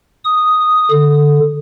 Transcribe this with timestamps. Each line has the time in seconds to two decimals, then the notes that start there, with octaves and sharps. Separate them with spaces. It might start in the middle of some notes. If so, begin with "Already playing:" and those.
0.24 D#6
0.91 D3